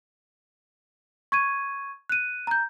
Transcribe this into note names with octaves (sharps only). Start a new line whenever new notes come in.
C#6 G#6 D#7
F#6 D#7
A#5 G6